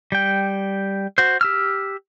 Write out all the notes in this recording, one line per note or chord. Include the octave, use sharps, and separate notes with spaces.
G3 G5
F#4 C5
G4 E6 F6